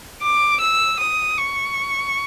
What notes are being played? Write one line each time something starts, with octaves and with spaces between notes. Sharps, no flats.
D6
E6
D#6
C#6